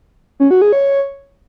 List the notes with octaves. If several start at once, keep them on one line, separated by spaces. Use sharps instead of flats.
C#4
F#4
G#4
C#5